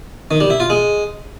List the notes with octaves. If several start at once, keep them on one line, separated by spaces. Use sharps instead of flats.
D#3
G3
E4
F4
G#3